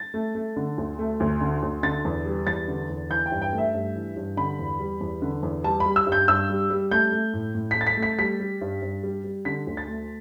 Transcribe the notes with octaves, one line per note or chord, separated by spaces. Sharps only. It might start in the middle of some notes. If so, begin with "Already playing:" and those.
Already playing: A6
A3
A3
D3
D2
A3
D2
D3
D2
D3 A6
E2
G3
E2 A6
D3
E2
E3 G6
G5
G2
G5
A3
E5
G2
E3
G2
D3 B5
E2
G3
E2
D3
E2
G3 A5
B5
G3
E6
G2
G6
G2 E6
G3
G3
A3 G6
A3
A2
A2
A3 B6
A6
B6
A3
B6
G3 B6
G3
G2
G2
G3
G3
D3 B6
D2
A6
A3